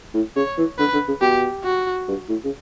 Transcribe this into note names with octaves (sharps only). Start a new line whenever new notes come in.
A2
C#3 C#5
E3
D3 B4
D3
C#3
B2 G4
F#4
G2
A2
C#3